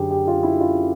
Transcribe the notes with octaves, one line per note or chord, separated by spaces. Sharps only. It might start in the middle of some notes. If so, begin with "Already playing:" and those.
Already playing: F#2 D3 G4 G#4
G4
F4
E4
F4